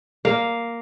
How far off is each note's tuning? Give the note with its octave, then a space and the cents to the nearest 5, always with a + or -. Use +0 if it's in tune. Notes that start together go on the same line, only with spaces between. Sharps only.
A#3 +0 F5 +0